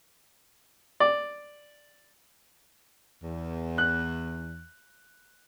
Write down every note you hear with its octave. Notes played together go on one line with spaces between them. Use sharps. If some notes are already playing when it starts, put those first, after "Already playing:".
D5
E2
F#6